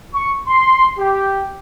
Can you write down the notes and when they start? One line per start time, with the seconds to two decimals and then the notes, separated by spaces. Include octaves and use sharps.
0.14 C#6
0.47 C6
0.99 G4